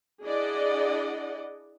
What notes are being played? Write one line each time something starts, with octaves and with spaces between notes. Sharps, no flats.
D4 E4 G#4 D5 D#5 F#5